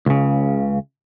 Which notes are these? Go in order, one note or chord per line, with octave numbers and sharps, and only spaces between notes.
C#2 C#3